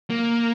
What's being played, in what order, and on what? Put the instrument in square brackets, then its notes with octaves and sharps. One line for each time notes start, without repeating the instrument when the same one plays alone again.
[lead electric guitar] A#3